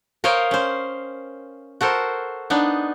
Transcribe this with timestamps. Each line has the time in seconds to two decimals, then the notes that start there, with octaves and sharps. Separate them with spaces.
0.24 A#4 C5 C#5 D#5 F5 G5
0.51 C#4 C5
1.81 F#4 A4 A#4 C5
2.50 B3 D4 D#4